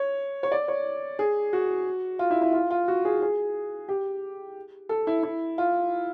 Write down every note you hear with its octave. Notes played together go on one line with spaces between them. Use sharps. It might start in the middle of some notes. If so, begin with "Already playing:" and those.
Already playing: C#5
C#5
D5
C#5
G#4
F#4
F4
E4
E4
F4
F4
F#4
G#4
G#4
G4
A4
E4
E4
F4